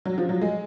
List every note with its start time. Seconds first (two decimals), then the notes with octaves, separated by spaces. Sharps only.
0.05 F#3
0.18 F3
0.29 F#3
0.41 G#3